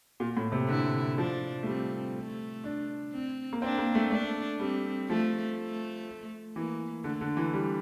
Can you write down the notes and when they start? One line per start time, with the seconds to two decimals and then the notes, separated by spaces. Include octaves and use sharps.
0.20 A#2
0.37 A2
0.52 C3
0.68 D3 E4
1.17 F3 D4
1.63 A3
1.66 G3 C4
2.15 A3
2.64 D4
3.13 C4
3.53 A#3
3.62 C4 D4
3.78 A#3
3.95 A3
4.11 A3 D4
4.59 G3 C4
5.09 F3 A3
5.58 A3
6.56 E3 A#3
7.04 D3 A3
7.21 D3
7.37 E3
7.53 G3